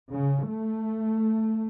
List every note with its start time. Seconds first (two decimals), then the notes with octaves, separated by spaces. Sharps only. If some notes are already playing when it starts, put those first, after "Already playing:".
0.11 C#3
0.48 A3